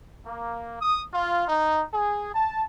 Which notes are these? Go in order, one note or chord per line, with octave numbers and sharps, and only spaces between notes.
A#3
D#6
F4
D#4
G#4
A5